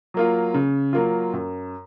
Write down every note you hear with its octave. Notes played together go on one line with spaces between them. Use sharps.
F#3 A#3 F4
C#3
F#3 A#3 F4
F#2